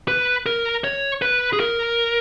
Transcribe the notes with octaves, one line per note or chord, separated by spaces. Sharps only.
B4
A#4
C#5
B4
G#4
A#4